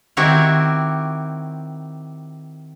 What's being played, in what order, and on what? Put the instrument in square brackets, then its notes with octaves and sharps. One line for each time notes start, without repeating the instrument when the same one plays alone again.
[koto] D#3 C4 E4 F#4 G4 C#5